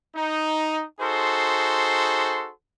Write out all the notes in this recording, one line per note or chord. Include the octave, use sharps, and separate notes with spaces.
D#4
D#4 F#4 G#4 A4 C5 C6